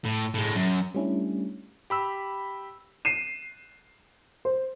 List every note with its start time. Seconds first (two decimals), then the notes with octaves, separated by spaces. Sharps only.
0.05 A2
0.34 A2 G#3
0.55 F#2
0.94 G3 A3 C#4 D4 E4
1.90 G4 B5 E6
3.05 C7 D#7 E7
4.45 C5